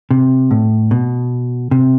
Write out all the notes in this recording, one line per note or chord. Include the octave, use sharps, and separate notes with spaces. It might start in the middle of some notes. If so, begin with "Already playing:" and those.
C3
A2
B2
C3